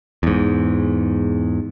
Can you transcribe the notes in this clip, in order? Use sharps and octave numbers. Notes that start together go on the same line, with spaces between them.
E2 G#2